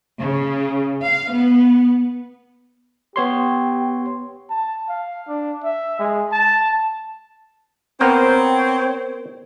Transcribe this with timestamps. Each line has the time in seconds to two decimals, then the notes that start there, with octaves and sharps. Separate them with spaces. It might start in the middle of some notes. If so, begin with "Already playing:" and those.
0.19 C#3
1.06 F5
1.34 B3
3.16 B3 G4 C#5 C6
4.50 A5
4.89 F5
5.28 D4
5.64 E5
6.00 G#3
6.32 A5
8.01 B3 C4 A#4 C5 C#5